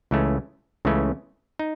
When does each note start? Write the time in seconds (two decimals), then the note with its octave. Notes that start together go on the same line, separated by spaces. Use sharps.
0.11 C#2 C#3 E3 A3 C#4
0.85 C#2 C#3 E3 A3 C#4
1.59 D#4